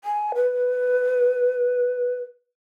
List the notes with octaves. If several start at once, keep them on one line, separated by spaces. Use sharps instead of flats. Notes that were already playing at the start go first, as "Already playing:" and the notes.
G#5
B4